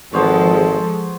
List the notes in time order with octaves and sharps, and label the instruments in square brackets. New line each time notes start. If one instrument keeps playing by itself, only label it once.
[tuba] G#1 [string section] F3 G#3 [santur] B3 C5 C#5 [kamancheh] A4